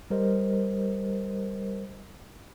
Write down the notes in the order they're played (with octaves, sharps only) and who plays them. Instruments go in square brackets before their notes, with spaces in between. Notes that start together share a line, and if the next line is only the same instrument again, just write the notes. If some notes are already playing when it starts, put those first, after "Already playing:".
[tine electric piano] G3 G4 A#4 C5 D#5